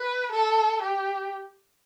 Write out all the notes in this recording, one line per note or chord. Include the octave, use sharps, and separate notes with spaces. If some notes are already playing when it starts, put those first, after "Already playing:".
Already playing: B4
A4
G4